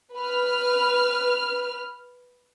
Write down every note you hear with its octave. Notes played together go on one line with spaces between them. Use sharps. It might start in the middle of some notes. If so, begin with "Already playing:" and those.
B4 F6